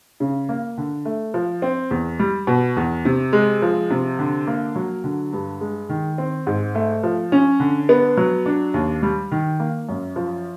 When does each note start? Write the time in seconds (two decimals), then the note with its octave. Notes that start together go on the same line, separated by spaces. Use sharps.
0.20 C#3
0.49 A#3
0.78 D3
1.05 A3
1.34 F3
1.62 C4
1.91 E2
2.19 G3
2.47 B2
2.77 E2
3.05 C3
3.33 G#3
3.62 F3
3.91 C3
4.19 D3
4.47 A#3
4.76 F#3
5.04 D3
5.33 G2
5.61 G#3
5.89 D#3
6.18 C4
6.47 G#2
6.75 A3
7.03 F3
7.32 C#4
7.60 D3
7.89 B3
8.17 F#3
8.46 D4
8.74 D#2
9.03 G3
9.31 D#3
9.60 A#3
9.89 F#2
10.16 F3